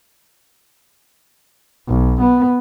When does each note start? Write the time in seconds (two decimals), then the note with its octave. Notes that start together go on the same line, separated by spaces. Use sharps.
1.88 B1
2.21 B3